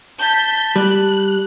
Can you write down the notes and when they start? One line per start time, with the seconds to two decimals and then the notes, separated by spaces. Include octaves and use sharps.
0.20 A5 G6 B6
0.76 G3 F#6